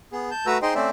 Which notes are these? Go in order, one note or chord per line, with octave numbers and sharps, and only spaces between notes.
B3 G#4
A5 G6
A3 F#4 B4 A#5 E6
D#4 G#4 C5 D#5 G5 C6
A3 C4 C#4 C5 D5 E5